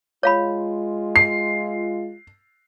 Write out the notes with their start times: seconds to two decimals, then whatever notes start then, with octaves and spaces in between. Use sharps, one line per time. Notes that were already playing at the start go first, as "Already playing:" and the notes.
0.23 G#3 F4 C#5 F5 B5
1.16 C7